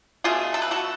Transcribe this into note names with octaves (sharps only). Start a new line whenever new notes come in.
B2 A3 F4 G#4
A4
B4
F#4 A4